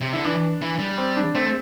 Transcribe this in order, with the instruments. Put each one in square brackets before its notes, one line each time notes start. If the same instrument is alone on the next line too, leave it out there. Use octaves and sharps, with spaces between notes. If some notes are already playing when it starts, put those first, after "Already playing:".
[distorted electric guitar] C3
[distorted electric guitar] D3 [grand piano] E4
[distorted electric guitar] E3 [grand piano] D4
[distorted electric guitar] E3
G3
[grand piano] C4
D4
[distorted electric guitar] A3 [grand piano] C4
[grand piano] C4